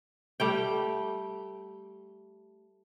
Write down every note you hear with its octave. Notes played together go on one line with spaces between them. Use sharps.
G3 A3 G5